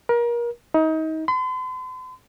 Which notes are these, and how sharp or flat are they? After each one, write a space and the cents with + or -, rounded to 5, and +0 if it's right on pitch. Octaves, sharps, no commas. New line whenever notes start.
A#4 +30
D#4 +30
C6 -45